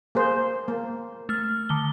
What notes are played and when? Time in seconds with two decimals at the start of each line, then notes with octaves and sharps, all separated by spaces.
0.15 A#3 G#4 C5
0.68 A#3
1.29 A3 F6
1.69 D3 D#3 G7